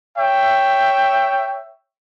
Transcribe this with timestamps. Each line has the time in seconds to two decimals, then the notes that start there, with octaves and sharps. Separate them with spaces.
0.18 C#5 E5 G5